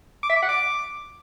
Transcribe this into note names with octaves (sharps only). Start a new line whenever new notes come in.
D6
E5
D6
F#5
D6